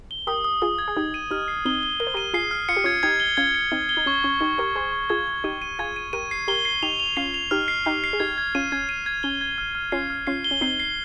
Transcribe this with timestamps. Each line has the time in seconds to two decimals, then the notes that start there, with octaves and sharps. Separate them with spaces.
0.11 G7
0.27 G4 A#4 D#6
0.45 D#6
0.62 F4 G#4 D#6
0.78 G#6
0.88 G#4
0.96 D#4 G4 G#6
1.14 D#7
1.31 D#4 G4 F6
1.48 C7
1.65 C4 D#4 G7
1.83 G7
2.00 A#4 G7
2.07 C5
2.14 G4 A#4 D#7
2.34 F4 G#4 C7
2.51 F6
2.69 F4 C#7
2.77 G4
2.84 C#4 F4 G#6
3.03 D#4 G4 G#6
3.20 G7
3.37 C#4 F4 G#6
3.55 C#7
3.72 C4 D#4 C#7
3.89 G7
3.97 D#4
4.06 C#4 C#6
4.24 C#4 C#6
4.40 D#4 G4 C#6
4.58 G4 A#4 C#6
4.76 G#4 C5 C#6
4.92 C#6
5.09 F4 G#4 G#6
5.27 G#6
5.44 D#4 G4 D#7
5.62 D#7
5.79 F4 G#4 G#6
5.96 D#7
6.13 G4 A#4 D#7
6.31 C7
6.48 G4 A#4 G7
6.65 C7
6.83 D#4 G4 F7
7.00 F7
7.17 C#4 F4 C7
7.34 F7
7.51 D#4 G4 F6
7.68 C7
7.85 D#4 G4 C7
8.04 C7
8.13 G#4
8.20 D#4 G4 G#6
8.38 G#6
8.55 C#4 F4 D#7
8.72 C#4 G#6
8.89 D#7
9.06 G#6
9.23 C#4 G7
9.41 G#6
9.58 F6
9.75 F6
9.92 C#4 F4 C7
10.10 F6
10.27 C#4 F4 C7
10.44 G7
10.51 C#4
10.61 C4 D#4 C7
10.79 C7